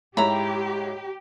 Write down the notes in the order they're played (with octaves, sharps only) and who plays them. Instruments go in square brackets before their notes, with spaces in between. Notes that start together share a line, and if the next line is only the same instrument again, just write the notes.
[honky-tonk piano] G#2 E4 C#5 [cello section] G4 [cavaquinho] A#5 B5